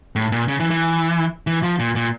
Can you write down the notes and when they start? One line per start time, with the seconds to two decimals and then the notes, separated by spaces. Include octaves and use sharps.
0.16 A2
0.32 A#2
0.48 C#3
0.60 E3
0.70 E3
1.47 E3
1.63 F3
1.79 A#2
1.96 A#2